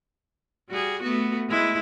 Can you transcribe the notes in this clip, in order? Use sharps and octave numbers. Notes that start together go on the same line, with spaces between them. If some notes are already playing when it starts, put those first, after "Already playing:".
G3 F#4 G#4
A3 B3 F#4
G#3 E4 B4